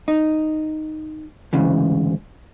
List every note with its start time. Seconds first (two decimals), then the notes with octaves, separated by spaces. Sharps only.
0.08 D#4
1.53 D2 G#2 C#3 E3